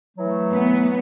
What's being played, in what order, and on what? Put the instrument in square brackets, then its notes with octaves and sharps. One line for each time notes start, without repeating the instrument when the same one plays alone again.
[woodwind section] E3 F#3 A3
[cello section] B3